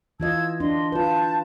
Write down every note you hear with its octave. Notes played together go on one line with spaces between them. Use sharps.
E3 F4 D#5 A5 E6 G#6
D4 D#5 C6
F4 B4 A5 G6